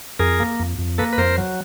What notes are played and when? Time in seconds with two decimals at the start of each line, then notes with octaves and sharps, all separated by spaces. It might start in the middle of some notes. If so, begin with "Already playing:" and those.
0.19 F2 G#4 A#4
0.40 A#3
0.60 F2
0.78 F2
0.98 A#3 A4 B4
1.13 B4
1.18 F2 A#4 C5
1.38 F#3